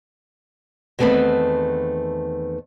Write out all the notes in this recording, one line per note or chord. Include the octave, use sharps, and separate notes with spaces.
E2 D#3 A3 B3 C4 B4